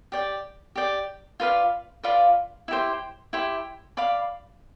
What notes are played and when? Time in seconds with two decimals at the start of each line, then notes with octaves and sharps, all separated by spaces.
0.12 G4 D5 G5
0.76 G4 D5 G5
1.40 F4 B4 D5 F5
2.03 F4 B4 D5 F5
2.68 E4 G4 C5
3.33 E4 G4 C5
3.97 D5 F5 B5 D6